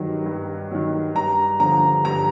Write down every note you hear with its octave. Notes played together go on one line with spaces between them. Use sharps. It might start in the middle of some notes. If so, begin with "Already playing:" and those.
Already playing: G2 D#3 F#3
G2
D#3 F#3
G2 A#5
D3 F3 A#5
G2 A#5